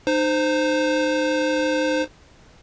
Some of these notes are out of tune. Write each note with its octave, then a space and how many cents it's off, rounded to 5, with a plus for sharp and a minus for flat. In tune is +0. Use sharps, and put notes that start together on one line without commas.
D#4 -30 C5 -10